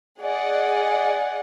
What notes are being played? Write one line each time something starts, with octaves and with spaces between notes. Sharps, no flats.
G#4 D5 D#5 F#5